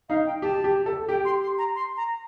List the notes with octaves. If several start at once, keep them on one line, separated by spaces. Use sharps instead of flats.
D#4 F5
G5
G4 A5
G4
A4
G4 G5
C6
C6
A#5
C6
A#5